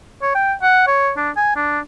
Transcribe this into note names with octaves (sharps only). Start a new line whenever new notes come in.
C#5
G5
F#5
C#5
D4
G#5
D4